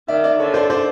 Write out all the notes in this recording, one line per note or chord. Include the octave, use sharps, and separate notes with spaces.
D#3 D5 E5
D5 E5
D3 C#5
C5 D5
C5 D5